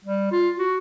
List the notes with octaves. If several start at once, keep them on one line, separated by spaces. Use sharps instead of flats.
G3
F4
F#4